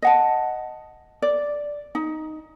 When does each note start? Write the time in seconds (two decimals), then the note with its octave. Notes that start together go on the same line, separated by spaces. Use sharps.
0.02 D#5 F#5 A5
1.22 D5
1.95 D#4